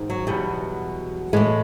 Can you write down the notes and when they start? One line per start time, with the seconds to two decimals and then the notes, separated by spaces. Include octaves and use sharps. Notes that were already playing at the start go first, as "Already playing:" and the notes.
Already playing: G#2 D#3
0.10 F#3
0.27 E2 B2 F#3 G3
1.33 A2 E3 G#3